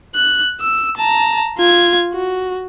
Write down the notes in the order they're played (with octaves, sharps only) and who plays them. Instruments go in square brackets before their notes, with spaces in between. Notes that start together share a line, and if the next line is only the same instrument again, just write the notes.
[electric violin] F#6
E6
A5 A#5
F4 G#6
F#4